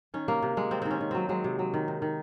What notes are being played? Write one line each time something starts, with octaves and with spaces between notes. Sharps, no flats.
D#3 C#4
C3 A#3
C3
C3 G#3
C3 C4
D#3 C4
C#4
D#3
F#3 C4
F#3 G#3
C3
F#3
D#3
C3
D#3